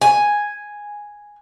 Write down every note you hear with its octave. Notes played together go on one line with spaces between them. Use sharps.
G#5